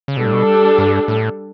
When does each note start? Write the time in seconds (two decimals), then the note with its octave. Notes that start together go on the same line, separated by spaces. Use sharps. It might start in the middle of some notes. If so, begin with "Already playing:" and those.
0.08 C#3
0.17 B2 G3 D4 A4
0.26 A2
0.33 B2
0.78 G2
1.08 A2